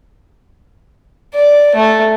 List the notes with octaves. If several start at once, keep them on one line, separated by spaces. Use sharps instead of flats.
D5
A3